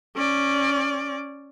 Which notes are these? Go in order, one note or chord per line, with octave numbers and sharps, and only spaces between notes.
C#4 D5